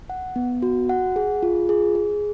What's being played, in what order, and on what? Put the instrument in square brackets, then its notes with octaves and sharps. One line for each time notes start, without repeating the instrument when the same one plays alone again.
[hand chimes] F#5
B3
F#4
F#5
G#4
F4
G#4
G#4